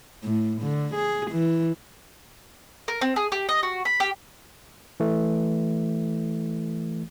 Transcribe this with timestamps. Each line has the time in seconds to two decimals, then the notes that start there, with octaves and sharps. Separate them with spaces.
0.24 A2
0.62 D3
0.95 G#4
1.31 E3
2.88 A#4
3.01 C4
3.16 G#4
3.32 G4
3.49 D#5
3.63 F#4
3.85 B5
4.00 G4
5.00 E3 A3